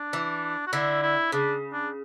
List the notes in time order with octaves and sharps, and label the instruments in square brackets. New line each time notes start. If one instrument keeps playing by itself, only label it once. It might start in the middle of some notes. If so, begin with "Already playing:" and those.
Already playing: [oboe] D4
[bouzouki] E3
[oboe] F#4
[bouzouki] D3 [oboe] E4
[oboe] E4
[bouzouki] C#3 [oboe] D4
[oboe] D4